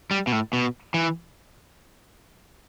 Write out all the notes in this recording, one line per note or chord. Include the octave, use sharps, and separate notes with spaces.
G3
B2
A2
B2
E3